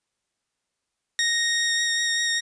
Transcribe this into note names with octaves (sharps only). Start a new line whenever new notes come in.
A#6